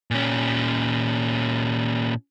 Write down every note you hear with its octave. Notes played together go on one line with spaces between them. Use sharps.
A#2 C#4